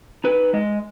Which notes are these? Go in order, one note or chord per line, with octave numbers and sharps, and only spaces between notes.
D#4 B4
G#3 D#5